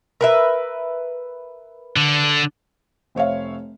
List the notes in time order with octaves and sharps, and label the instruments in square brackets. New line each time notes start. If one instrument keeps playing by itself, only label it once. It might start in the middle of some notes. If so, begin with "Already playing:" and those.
[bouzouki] A#4 B4 E5
[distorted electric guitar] D3
[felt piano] F1 C5 C#5 E5 F5